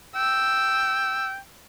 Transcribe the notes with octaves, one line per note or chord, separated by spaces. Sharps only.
G5 E6